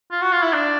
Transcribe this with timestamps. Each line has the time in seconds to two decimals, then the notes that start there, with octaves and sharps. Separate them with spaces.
0.11 F4
0.22 F#4
0.33 F4
0.42 E4
0.53 D4